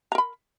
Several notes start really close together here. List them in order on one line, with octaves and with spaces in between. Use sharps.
A#5 A#4 B5